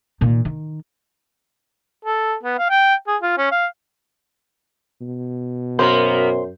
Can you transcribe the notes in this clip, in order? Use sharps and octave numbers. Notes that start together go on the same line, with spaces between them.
A#2 D#3
D#3
A4
B3
F5
G5
G#4
F4
C#4
F5
B2
F#2 A#3 B3 A#4 C5